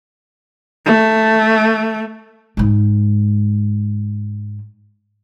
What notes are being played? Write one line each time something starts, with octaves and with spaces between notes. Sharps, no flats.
A3
G#2 G#3